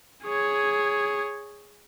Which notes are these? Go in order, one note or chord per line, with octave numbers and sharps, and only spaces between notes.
G#4 C#5